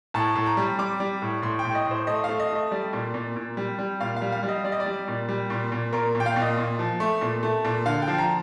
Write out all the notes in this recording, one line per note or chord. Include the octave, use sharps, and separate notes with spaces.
A2 A5
A2
A#5
G3
G3 D6
G3
A2
A2 C6
G5
A2
D#5
A2 C5
A3 D#5
A3 F5
D#5
A3 D#5
G3 D5
A#2
A#2
A#2
G3
G3
A#2 F5
F5
G3
F5
G3
D#5
G3 D5
D#5
D5
G3
A#2
G3
A#2
A#2
A#2 A#4
A#2
G5
F5
A#2
D#5
A#2
F3
A3
A#2
A3
A#2
D3 F5
G5
F3
A#5